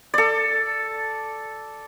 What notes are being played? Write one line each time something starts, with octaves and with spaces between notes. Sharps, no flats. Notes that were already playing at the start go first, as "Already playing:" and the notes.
A4 D5